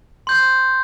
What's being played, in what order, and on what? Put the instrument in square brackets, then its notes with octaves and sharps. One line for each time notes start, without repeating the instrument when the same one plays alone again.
[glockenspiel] C6 G6